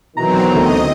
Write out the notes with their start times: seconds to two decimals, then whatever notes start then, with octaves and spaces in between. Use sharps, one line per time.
0.17 B2 D#3 E3 F#3 C4 A#5
0.54 D2 D3 A3 D#5